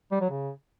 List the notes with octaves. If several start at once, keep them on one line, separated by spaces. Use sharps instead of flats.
G3
F#3
C#3